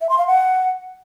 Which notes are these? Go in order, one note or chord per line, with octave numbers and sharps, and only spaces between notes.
E5
C6
F5
F#5